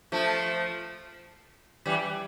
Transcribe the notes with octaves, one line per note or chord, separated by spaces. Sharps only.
F3 A3
E3 G3